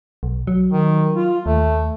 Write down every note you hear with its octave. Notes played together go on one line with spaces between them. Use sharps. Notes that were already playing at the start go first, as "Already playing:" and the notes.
B1
F#3
D#3
F4
D#2 A3